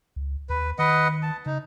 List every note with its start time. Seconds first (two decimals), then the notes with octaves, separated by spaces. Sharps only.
0.16 C#2
0.49 D#2 B4
0.79 D#3 B4 D#5 F#5
1.23 A5
1.46 C#3 D#4